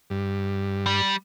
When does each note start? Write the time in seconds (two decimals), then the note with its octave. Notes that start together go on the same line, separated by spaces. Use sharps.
0.10 G2
0.86 G3